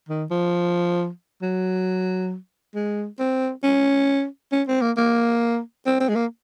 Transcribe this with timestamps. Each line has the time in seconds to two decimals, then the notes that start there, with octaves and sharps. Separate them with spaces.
0.09 D#3
0.31 F3
1.42 F#3
2.75 G#3
3.19 C4
3.63 C#4
4.52 C#4
4.68 C4
4.81 A#3
4.97 A#3
5.86 C4
6.00 C4
6.09 G#3
6.15 A#3